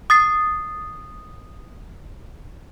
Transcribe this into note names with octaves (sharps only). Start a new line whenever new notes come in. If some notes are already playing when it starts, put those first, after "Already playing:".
D#6 A6 C7